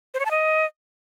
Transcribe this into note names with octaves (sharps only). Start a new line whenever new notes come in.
C5
C#5
A5
D#5